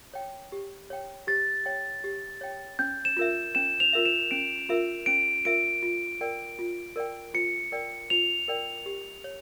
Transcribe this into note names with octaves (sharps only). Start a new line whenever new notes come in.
C#5 G5
G4
C#5 G5
G4 A6
C#5 G5
G4
C#5 G5
C#4 G6
E7
F4 A#4 E5
C#4 E7
F7
F4 A#4 E5
E7
C#4 D7
F4 A#4 E5
C#4 D7
F4 A#4 E5 D7
F4
A#4 D5 G5
F4
A#4 D5 G5
F4 C#7
A#4 D5 G5
F4 F7
A#4 D5 G5
G4
C#5